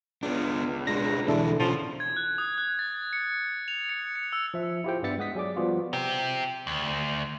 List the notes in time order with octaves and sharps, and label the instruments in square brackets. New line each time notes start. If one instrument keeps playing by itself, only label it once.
[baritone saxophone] C#2 [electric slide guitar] B3 D4
[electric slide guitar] G#3 D4 [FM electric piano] A#6
[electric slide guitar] B2 D3 E3 [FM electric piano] D4 E4 A4
[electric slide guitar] B2 D3 C#4 [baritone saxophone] F3
[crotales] G#6
F#6
D#6
F#6
A6
C#7
F7
C#7
C#7
E6
[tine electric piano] F3 E5
E4 F4 G4 G#4 C5 G5
G2 G3 B3 E5 A6 C#7
G#3 F#5 D#6 B6
F#3 G#4 D5 D6
F3 G3 B3 F4 F#4
[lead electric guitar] C4 G4
D2